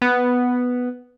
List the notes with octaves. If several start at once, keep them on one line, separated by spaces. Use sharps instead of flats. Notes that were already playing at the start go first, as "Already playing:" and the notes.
B3